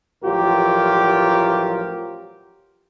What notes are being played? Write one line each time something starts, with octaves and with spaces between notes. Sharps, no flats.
A1 F3 F#3 F4 G4 A#4